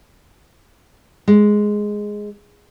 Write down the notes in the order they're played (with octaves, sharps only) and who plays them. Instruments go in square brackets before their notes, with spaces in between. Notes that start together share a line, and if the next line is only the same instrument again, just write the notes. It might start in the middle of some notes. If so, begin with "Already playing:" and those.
[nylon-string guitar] G#3